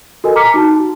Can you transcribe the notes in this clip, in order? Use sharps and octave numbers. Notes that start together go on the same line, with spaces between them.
F#4 A4 A#4 D#5 G#5
A#5 D6 F6 B6 C#7
D#4 F#4 A5
F#4